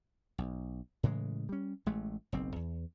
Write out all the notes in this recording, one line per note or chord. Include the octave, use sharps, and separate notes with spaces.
B1
A2 C#3 E3 G#3
G3 C#4
A1 G#3 A3
F#1 B1 C4
E2